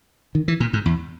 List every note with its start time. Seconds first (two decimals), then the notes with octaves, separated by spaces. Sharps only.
0.35 D#3
0.48 E3
0.60 A#2
0.73 G#2
0.86 E2